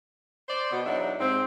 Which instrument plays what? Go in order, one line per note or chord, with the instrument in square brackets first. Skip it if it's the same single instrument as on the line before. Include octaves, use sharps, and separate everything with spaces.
[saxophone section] C5 D5
B2
E2 F#3 D4 D#4 E5
G#2 C4